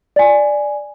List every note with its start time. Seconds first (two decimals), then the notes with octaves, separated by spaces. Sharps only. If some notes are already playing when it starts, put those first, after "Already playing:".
0.16 D5 G#5